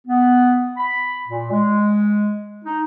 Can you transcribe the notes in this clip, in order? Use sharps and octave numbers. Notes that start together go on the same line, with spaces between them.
B3
B5
A#2
G#3
D#4